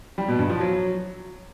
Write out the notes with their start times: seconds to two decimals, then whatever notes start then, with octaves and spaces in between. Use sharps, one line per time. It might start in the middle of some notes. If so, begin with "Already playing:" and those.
0.18 G3
0.28 B2
0.39 G2
0.50 F3
0.60 F#3